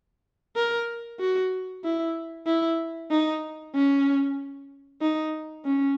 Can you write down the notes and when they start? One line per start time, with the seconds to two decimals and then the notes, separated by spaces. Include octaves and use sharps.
0.56 A#4
1.20 F#4
1.84 E4
2.46 E4
3.11 D#4
3.74 C#4
5.01 D#4
5.65 C#4